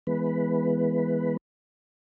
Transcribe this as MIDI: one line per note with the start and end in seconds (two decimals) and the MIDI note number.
0.07 1.37 52
0.07 1.37 56
0.07 1.37 59
0.07 1.37 71